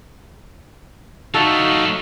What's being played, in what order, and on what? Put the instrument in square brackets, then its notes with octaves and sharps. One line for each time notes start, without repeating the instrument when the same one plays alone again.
[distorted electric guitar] F#3 A3 [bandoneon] D#4 F#4 F5 [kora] A4